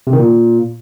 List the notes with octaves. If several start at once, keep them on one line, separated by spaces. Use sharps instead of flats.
C3
D#3
A#2